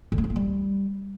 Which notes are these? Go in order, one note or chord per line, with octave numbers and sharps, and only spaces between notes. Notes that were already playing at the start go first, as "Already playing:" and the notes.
D3
A3
C#4
A#3
G3